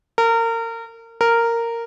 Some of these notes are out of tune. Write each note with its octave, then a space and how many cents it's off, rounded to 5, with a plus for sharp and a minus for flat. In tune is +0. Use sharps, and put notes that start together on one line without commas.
A#4 -30
A#4 -10